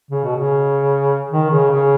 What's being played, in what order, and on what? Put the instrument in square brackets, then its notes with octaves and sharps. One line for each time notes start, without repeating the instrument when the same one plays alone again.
[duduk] C#3
B2
C#3
D#3
C#3
C#3